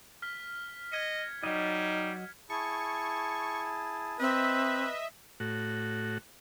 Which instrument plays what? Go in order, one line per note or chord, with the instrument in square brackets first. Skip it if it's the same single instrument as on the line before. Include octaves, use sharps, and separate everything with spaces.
[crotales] F6 B6 G7
[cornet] D#5 [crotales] G#6 C#7
[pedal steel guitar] F#3 D#5 [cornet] G3 [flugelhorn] D#4
[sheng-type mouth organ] E4 G#4 A5 [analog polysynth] C#6
[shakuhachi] C4 [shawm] B4 [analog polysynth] D#5 E5
[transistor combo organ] A2 F#4